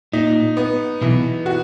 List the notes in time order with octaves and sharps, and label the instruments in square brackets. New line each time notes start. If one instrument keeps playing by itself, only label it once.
[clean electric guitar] A#2 [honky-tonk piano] D#4
[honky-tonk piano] B3
[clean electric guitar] B1 B2 [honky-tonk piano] E3
[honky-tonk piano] F#4